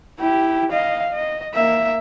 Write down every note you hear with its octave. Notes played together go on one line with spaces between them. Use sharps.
E4 G4
D#5 F5
D#5
A#3 E5